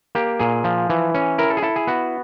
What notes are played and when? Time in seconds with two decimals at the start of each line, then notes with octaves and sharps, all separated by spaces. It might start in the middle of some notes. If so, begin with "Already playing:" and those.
0.15 A#3 G4
0.39 A#2 G#4
0.64 F3
0.90 E3
1.14 C#4
1.38 E4 A#4
1.50 A4
1.57 G#4
1.62 E4 A4
1.76 G#4
1.87 B3 F#4